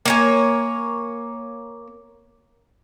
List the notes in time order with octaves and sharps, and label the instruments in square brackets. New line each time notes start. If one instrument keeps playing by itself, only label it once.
[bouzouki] A#3 C#5 G#5